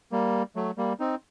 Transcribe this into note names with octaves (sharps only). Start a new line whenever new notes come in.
G3 A#3
F#3 A3
G3 A#3
C4 D#4